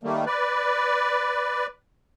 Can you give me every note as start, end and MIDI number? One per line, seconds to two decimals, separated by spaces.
0.04 0.25 51
0.04 0.25 55
0.04 0.25 57
0.04 0.25 58
0.26 1.66 71
0.26 1.66 74